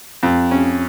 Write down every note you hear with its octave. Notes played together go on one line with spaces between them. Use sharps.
F2
C#4